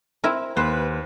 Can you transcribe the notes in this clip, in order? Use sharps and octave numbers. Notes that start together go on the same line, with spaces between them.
C4 E4 A#4
D#2 B4 C5